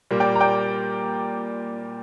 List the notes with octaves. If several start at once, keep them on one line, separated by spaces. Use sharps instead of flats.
A#2 G3 A#3
D5 G5
A#5
D5 G5